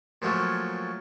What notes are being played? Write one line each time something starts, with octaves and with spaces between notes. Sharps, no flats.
A#2 F3 F#3 A3 C#4